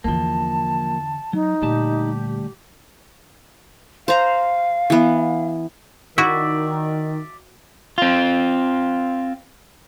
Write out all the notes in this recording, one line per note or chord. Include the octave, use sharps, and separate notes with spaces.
E2 D3 F3 A#3 A5
F#3 D#4
D2 A#2 G3 G4 A5
C5 F5 A#5
E3 B3
D#3 E4 F#4 D5 E5
C4 F4